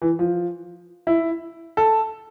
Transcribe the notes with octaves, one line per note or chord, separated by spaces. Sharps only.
E3
F3
E4
A4